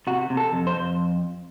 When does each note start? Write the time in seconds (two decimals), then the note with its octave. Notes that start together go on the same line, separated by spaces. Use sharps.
0.07 C3 F#4
0.30 C3
0.37 A4
0.53 F2
0.67 C5
0.75 F2